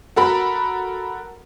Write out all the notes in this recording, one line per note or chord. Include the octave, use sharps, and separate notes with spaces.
F#4 A4 A#4 B5